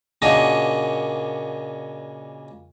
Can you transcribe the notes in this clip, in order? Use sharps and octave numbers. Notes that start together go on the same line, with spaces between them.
A#2 C#3 A#3 D4 F#4 D#5